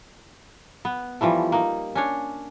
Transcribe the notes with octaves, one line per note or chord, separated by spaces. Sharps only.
B3
E3 F3 G3 A3
A#3 D#4
C#4 D4 C#5